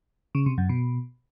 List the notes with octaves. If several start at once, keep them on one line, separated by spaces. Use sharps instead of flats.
C#3
C3
F#2
B2